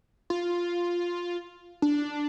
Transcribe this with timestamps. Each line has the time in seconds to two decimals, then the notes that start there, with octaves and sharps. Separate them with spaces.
0.30 F4
1.82 D4